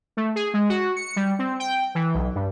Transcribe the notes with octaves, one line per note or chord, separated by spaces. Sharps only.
A3
G#4
G#3
F#4
C#7
G3
C4
G5
E3
B1
G2